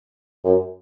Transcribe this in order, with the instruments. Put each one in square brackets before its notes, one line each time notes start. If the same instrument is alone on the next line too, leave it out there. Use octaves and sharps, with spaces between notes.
[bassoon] F#2